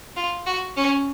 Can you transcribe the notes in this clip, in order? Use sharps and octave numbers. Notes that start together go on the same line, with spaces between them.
F4
F#4
C#4